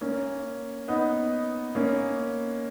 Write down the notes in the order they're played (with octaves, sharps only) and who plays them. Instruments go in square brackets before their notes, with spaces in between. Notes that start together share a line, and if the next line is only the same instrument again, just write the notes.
[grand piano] A#3 C#4
B3 D#4
A#3 C#4